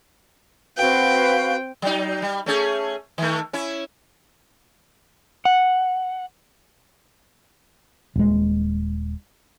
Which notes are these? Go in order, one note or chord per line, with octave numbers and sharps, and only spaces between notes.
C4 F#4 B4 F5 G5
F#3 D#4
G3
A3 C#4 G#4
D#3 A3
C#4 E4
F#5
D#1 G#3